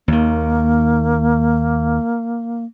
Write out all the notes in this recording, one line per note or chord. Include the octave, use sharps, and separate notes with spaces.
D#2 D#3 A#3